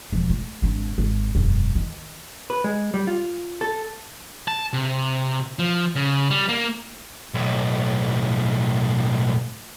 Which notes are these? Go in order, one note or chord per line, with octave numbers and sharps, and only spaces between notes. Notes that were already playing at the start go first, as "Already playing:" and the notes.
E1 F3
A3
G#1 D4
G#1
E1 F#2
D#3
B4
G#3
G3
F4
A4
A5
C3
F3
C#3
G3
A#3
B1 A2